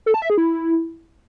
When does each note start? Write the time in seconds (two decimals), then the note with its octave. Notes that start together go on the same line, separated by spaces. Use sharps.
0.06 A4
0.14 A5
0.22 E5
0.30 G#4
0.38 E4